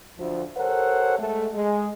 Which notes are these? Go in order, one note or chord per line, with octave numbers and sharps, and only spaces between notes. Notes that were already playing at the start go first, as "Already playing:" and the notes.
D2 F3
G4 A4 A#4 C5 C#5 F#5
G#3 A3
G#3